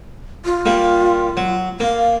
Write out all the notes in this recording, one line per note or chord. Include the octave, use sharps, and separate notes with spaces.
F4
G3 A#3
F#3
A#3 F5